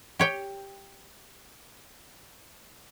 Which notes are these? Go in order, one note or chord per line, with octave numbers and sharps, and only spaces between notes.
G4 C#5 G5